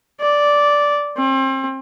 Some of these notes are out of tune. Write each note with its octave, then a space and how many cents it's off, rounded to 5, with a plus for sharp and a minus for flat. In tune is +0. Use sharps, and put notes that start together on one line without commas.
D5 -5
C4 +35